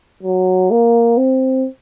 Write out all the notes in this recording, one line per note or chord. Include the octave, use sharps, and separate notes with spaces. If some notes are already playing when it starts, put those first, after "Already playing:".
F#3
A#3
C4